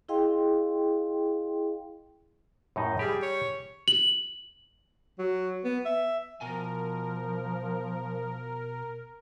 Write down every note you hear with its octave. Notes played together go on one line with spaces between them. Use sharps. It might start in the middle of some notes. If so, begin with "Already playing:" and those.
E4 G#4 D#5 F5 G5 C6
F#2 A2 D#4
G3 G4 G#4
C#5
F#7
F#3
B3
E5
B2 F3 A#4 G#5